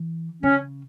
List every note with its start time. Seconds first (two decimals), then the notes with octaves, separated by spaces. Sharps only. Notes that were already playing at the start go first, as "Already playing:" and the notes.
Already playing: E3
0.43 C#3 C#4